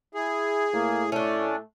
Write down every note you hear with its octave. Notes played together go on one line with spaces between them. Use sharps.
E4 G#4
A2 A#3
A3 C#4 D4